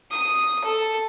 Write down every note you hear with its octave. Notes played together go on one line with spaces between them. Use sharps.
D#6
A4